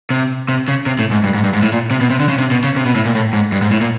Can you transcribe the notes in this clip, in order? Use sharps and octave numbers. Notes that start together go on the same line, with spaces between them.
C3
C3
C#3
C3
A2
G#2
G2
G#2
G2
G#2
A2
A#2
C3
B2
C3
D3
C#3
C3
B2
C#3
C3
B2
A2
A#2
A2
G#2
G2
G#2
A2
A#2